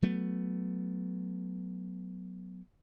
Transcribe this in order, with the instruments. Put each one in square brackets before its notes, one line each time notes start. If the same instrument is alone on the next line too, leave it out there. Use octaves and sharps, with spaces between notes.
[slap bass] F#3 A3 B3